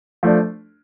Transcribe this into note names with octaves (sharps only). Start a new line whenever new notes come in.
F3 A3 D4